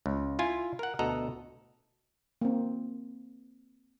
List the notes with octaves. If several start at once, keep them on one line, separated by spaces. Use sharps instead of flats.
C#2
E4 F4 G#5
A#4 F#5
D2 B2 A4 D#5 F#5 A#5
A#3 C4